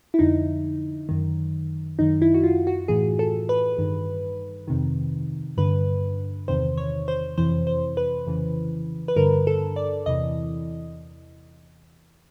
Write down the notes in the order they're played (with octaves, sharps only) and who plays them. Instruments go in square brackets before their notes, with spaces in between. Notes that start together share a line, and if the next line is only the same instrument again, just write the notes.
[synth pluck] E4
F2 D3 D#4
F#2 D#3
F#2 D#3 D#4
E4
F#4
F4
F#4
A2 E3 G#4
A4
B4
G2 D#3
F2 C3 D#3
G2 D3 B4
E2 C3 D#3 C5
C#5
C5
F2 C3 E3 C5
C5
B4
F2 C#3 E3
B4
G2 D3 A#4
A4
D5
E2 C3 E3 D#5